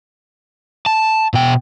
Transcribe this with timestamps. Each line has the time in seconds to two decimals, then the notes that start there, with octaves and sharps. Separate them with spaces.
0.86 A5
1.34 B2 G5